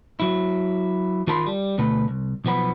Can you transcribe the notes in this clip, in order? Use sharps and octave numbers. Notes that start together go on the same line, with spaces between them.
F#3 E4
D#3 F4 A#4 A5 B5 C6
G3
D2 B2 A3 B4
C2
B1 F3 B3 B5